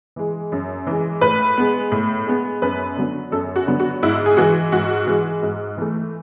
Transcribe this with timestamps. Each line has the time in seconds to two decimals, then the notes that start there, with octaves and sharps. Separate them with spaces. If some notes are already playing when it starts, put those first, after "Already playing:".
0.16 E3 G#3
0.52 F#2
0.87 E3 G#3
1.21 A2 B4
1.57 G#3 B3
1.91 A2
2.27 G#3 B3
2.62 F#2 B4
2.97 D3 F#3 B3
3.32 F#2 A4
3.56 F#4
3.67 D3 F#3 B3
3.79 F#4
4.03 G#2 E4
4.26 G#4
4.37 E3 G#3 F#4
4.72 G#2 F#4
5.07 E3 G#3
5.43 G#2
5.77 E3 A3